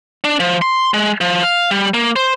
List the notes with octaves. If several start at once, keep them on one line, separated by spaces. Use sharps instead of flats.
D4
F3
C6
G#3
F3
F5
G3
A#3
C5